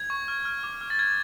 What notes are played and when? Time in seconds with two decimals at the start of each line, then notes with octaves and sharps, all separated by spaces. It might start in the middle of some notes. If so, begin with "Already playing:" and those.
Already playing: G#6
0.10 C#6
0.28 F6
0.45 F6
0.63 D6
0.81 F6
0.90 A6
0.98 F6 G#6